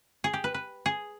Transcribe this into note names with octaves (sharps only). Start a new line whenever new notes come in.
G#4
G4
B4
B4
G#4